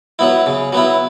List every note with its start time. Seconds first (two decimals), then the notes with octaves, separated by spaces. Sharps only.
0.19 F#3 B3 E4
0.46 C#3
0.73 F#3 B3 E4